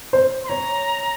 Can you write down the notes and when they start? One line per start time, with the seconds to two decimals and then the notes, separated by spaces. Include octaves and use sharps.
0.13 C5
0.44 C6
0.49 C#5 A#5